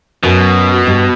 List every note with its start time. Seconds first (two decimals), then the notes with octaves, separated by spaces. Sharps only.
0.23 F#2 B2 F#3
0.87 G2 G3